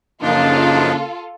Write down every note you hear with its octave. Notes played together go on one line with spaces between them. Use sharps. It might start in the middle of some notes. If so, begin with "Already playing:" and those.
F#2 C#3 F3 A#3 D4 D#4 F4 A4